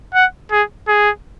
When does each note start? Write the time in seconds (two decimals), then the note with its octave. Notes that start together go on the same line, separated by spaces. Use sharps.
0.14 F#5
0.51 G#4
0.88 G#4